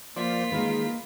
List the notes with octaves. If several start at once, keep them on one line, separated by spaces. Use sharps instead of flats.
F3 A#3 F4 C5 D5 B6
D#3 G#3 A#3 A#4 B4